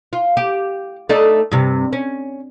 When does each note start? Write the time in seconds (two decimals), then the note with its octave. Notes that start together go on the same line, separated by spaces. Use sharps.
0.13 F4
0.37 G4
1.09 A3 D4 D#4
1.51 G2 C3
1.93 C#4